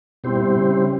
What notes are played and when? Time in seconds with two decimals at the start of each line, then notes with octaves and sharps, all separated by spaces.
0.24 B2 G3 C4 E4 G4 C5
0.35 A#2
0.46 B2
0.56 C#3